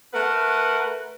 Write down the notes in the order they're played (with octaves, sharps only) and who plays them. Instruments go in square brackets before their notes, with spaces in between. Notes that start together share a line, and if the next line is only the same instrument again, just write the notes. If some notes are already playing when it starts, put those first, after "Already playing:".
[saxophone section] A3 B4 [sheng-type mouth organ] A#4 F#5